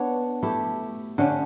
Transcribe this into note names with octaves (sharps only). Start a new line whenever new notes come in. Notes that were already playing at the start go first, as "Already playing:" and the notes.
Already playing: B3 D4 C#5
A3 E4 G4
D3 A3 C#4 G4